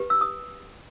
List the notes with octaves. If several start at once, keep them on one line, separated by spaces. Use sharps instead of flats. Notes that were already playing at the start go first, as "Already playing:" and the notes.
Already playing: G4 B4
E6
D#6